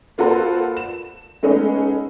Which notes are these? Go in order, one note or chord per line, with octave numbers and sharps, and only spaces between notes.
A#3 F4 F#4 A4 B4 C5
E7
G#3 A3 B3 C#4 D#4 G#4